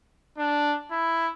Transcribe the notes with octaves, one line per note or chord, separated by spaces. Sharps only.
D4
E4